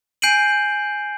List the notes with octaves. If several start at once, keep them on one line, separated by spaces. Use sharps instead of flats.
G#5 G6 C7 D7 D#7 F#7